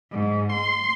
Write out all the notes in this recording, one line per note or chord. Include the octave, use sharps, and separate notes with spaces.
G#2
C6